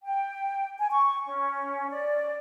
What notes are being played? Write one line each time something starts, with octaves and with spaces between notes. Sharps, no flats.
G5
G#5
C#6
C#4
D5